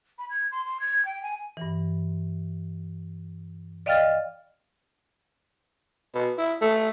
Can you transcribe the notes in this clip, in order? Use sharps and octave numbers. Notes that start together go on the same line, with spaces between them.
B5
G#6
C6
C6
G#6
G5
G#5
G2 E3
D5 D#5 F5 G5 F6 A6
B2
E4
A3